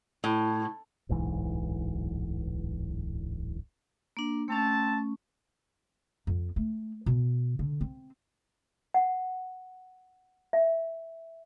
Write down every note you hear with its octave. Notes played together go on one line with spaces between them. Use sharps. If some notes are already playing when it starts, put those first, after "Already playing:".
A2 E4
D1 B1 G#2 E3
A#3 D4
A3 C4 C#4 A5
F2
A3
B2
D3
C4
F#5
E5